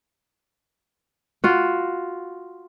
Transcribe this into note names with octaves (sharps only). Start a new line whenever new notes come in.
F4 F#4